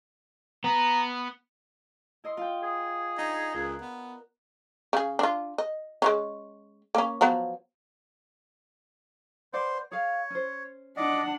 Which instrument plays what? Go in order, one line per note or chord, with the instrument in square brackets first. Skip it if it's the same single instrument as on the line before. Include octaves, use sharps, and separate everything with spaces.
[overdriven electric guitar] B3 [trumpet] A#5
[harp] E4 D#5 C6
F4 G5
[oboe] G#4
[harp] D4 [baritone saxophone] D#4
[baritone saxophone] C#2 [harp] A#4 F#6
[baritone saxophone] B3
[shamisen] C#3 G#4
D4 F4
D#5
G#3 A3 C#4
A#3 C#4
F3 F#3 B3
[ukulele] B4 D5 F#5 [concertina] C5
[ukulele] G#4 F5 [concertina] C#5
[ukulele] C#4 C5
[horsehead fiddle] D4 F#5 [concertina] D5 D#5